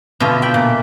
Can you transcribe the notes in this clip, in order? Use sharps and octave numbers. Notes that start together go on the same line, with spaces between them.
B2 D3 F4 E5
E5 G5 B5
A#2